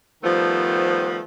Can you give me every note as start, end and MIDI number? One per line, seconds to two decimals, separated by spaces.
0.23 1.21 51
0.23 1.21 53
0.23 1.21 55
0.23 1.21 57
0.23 1.21 59
0.23 1.21 72